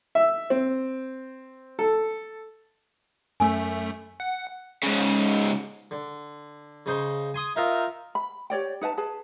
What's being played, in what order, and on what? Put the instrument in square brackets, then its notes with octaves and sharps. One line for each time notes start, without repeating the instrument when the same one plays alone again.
[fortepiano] E5
C4
A4
[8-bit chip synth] F#2 A3 [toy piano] G#5 E6
[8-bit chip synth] F#5
[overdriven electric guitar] G#2 C#3
[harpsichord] D3
C#3 D#4 C5
G#5 C6 D#6
[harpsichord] D#4 [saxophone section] F4 A#4 E5
[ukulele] B5
G4 C#5 D5 G5
D#4 B4 E5 A5
G#4 B4 A5